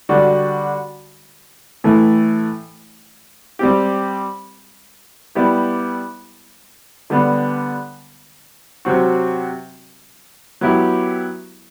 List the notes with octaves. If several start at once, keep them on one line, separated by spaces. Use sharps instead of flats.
D3 G3 D4 F#4
A2 E3 A3 E4
G3 C4 G4
G3 B3 E4 G4
D3 G3 B3
C3 F#3 C4 F#4
F#3 B3 E4 G4